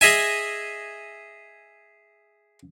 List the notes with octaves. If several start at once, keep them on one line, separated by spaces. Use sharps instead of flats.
G#4 D#5 E5 G#5